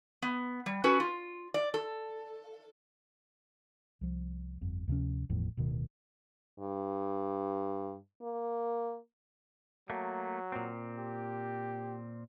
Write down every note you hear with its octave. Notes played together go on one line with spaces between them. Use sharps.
B3
G3
C#4 F#4 A4 B4
F4
D5
A4
C2 F3
G1 F2
D2 C3 F3 C#4
G1 E2 A2 F3
D1 B2 D#3
G2
A#3
F#3 A3 A#3
A#2 C4
G4